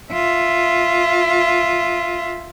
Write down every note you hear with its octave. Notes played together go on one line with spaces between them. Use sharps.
F4 E5